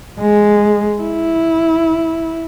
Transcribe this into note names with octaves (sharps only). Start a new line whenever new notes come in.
G#3
E4